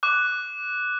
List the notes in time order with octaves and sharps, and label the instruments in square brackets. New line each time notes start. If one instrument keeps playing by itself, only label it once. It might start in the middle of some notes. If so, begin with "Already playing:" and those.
[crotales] D6 F#6